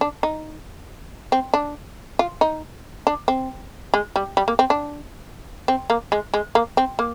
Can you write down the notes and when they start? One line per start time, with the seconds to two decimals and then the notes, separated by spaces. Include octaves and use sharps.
0.01 D4
0.23 D#4
1.32 C4
1.54 D4
2.19 F4
2.41 D#4
3.07 D4
3.28 C4
3.94 G#3
4.16 G3
4.37 G3
4.48 A#3
4.59 C4
4.70 D4
5.68 C4
5.90 A#3
6.12 G#3
6.34 G#3
6.55 A#3
6.77 C4
6.99 A#3